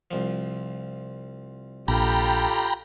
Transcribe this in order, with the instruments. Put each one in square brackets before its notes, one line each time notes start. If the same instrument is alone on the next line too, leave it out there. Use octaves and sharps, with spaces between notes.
[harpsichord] C2 F3
[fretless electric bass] A#1 [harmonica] F4 G4 A4 [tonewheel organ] G5 A#5 B5